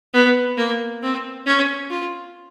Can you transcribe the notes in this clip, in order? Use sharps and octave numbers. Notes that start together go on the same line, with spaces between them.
B3
A#3
C4
C#4
F4